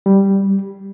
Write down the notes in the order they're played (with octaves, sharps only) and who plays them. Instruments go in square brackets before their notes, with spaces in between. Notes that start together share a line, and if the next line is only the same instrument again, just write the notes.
[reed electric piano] G3